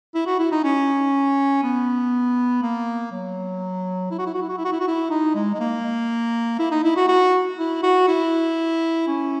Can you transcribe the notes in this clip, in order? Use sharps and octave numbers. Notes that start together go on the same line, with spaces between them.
E4
F#4
E4
D#4
C#4
B3
A#3
F#3
E4
F#4
E4
F#4
E4
F#4
E4
F#4
E4
F#4
E4
D#4
G#3
G#3
A#3
E4
D#4
E4
F#4
F#4
E4
F#4
E4
C#4